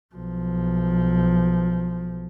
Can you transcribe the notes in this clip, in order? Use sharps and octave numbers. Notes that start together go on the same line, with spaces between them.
B1 F3